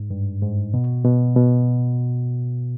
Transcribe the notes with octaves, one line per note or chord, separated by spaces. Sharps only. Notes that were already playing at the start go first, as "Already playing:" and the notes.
Already playing: G#2
G2
G#2
B2
B2
B2